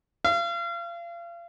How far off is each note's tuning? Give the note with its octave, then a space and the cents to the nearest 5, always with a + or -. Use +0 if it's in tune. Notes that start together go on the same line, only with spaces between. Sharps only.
F5 -35